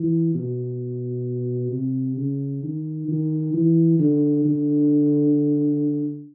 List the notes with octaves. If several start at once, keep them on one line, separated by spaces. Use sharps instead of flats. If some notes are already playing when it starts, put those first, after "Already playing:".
Already playing: E3
B2
C3
C#3
D#3
D#3
E3
D3
D3